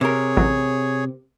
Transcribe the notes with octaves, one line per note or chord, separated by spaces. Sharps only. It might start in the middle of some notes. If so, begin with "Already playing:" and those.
C3 G#4 A#4 C#5
A1 F#3